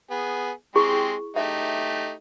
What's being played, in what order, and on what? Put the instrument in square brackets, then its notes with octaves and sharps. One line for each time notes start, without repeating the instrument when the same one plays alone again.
[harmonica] B3 G#4
[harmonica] G#3 C4 G4 [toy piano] E4 G#4 C#6
[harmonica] A3 D#4 G4 [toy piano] E5